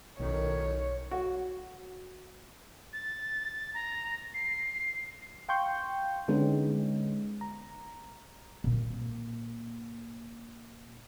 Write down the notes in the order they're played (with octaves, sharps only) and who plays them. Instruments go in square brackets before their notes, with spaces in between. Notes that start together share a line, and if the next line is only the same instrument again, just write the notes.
[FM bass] B1 [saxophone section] F#2 A2 D#3 [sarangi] C#5
[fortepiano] F#4
[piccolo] A6
A#5
C7
[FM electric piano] F5 G5 C6 C#6 G6
D3 G#3 B3 C#4 D#4
A#5
[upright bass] A#2 A#3